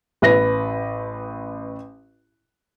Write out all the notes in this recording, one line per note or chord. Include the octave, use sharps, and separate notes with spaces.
A1 B4 A#6